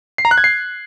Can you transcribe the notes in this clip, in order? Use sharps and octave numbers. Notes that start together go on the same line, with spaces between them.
C7
A#5
F#6
G#6
C7